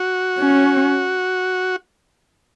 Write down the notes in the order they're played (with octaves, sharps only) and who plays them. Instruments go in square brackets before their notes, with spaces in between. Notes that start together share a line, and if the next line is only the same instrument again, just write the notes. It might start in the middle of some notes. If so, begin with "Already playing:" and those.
Already playing: [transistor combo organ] F#4
[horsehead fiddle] C#4